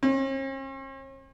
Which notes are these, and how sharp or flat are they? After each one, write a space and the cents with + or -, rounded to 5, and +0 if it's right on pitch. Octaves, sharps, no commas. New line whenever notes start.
C#4 -45